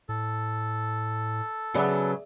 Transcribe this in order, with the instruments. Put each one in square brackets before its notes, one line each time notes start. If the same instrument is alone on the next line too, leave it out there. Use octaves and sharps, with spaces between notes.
[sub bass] A2 [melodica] A4
[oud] C#3 F#3 B3 [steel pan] G#4 D5 E5